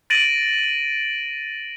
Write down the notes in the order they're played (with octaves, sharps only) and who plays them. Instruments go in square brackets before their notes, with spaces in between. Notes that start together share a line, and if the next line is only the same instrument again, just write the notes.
[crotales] A6 A#6 D7 D#7 F#7